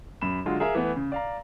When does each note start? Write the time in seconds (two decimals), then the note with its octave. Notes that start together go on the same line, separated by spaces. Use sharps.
0.22 F#2 B5 E7
0.46 D3 F#3 G#3 F4
0.60 G#4 A#4 E5 F5
0.75 E3 A3 B3
0.96 C#3
1.12 D5 F5 A#5